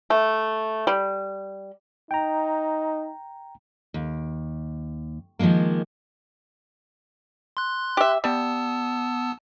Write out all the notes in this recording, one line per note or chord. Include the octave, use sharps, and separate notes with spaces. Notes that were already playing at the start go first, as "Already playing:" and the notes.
A3
G3
D#4 G5 A#5
D#2
D#3 F3 F#3 G#3 A#3
C6 F#6
G4 E5
G3 B3 A5 E6